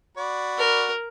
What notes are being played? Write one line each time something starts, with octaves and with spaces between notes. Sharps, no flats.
F#4 D5 B5
A#4